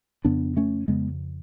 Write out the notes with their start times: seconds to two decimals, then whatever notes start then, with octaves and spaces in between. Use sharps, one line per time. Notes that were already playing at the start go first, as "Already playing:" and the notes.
0.25 F2 C#3 B3 D4
0.57 A3 C#4
0.88 F2 C#3 G#3 B3